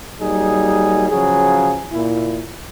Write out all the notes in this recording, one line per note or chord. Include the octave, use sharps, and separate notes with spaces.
F#3 G3 A#3 D#4 G#4
C#3 F3 F#3 G#4
A#2 E4